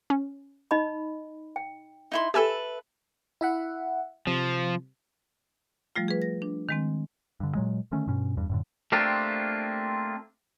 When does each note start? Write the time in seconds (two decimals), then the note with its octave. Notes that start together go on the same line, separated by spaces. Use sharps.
0.10 C#4
0.71 D#4 D#5 B5
1.56 G5
2.12 D#4 E4 C6
2.34 G4 A4 B4 E5 G#5 E6
3.41 E4 E5 F#5
4.27 C3 F3
5.96 F3 G3 A3 F4
6.08 G#4 B4
6.22 A#6
6.42 D4
6.69 D#3 G#3 C4
7.40 G2 D3
7.55 A#2 F#3 G#3
7.92 D3 D#3 A3 C#4
8.07 G2 B2 C#4
8.37 E2 G2
8.50 F#2 A2 D3
8.92 A3 A#3 C4 D4 F4 G4